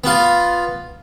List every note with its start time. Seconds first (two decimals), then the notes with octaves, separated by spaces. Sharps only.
0.04 B3 F4